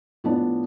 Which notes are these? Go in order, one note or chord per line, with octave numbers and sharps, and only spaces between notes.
A2 F3 B3 D4